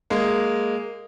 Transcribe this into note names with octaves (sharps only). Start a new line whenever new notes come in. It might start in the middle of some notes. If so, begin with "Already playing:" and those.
G#3 A#3